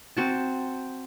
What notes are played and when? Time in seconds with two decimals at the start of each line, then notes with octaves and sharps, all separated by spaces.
0.17 C4 F#4 A5